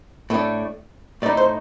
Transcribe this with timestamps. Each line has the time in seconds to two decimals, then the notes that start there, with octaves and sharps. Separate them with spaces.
0.30 A2 A3 D4
1.22 A2 A3 D#4 D5
1.37 C5